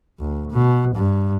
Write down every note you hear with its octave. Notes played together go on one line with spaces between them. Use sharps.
D2
B2
G2